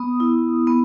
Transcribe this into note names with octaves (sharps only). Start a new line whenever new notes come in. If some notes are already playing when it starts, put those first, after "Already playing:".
Already playing: B3 D#6
E4
B3